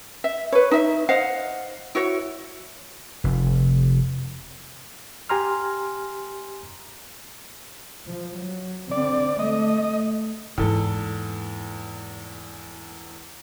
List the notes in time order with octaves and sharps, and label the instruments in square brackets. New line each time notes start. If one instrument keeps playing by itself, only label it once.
[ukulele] E5
B4 C#5
D#4 E5
C5 D#5 F5 F#5
E4 F#4 C#5
[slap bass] F1
[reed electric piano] G4 G#5 A#5 C6 F6
[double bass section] F3
F#3
[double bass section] D3 C4 [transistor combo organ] D5
[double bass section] A3 [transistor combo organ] D#5
[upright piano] E2 A4 [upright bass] G#2 A#3